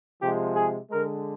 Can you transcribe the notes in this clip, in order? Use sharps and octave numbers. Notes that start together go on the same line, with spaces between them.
C3 F3 G#3 G4
G#4
D3 G#3 A#4